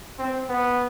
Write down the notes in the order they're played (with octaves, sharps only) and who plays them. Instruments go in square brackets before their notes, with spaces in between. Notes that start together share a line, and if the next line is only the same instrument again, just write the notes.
[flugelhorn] C4
B3